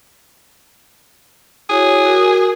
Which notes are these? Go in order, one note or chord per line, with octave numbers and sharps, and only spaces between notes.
E4 F#4 G#4 C#5
F#4 A#4